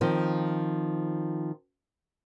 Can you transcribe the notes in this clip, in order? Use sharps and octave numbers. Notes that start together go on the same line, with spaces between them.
D#3 F3 C4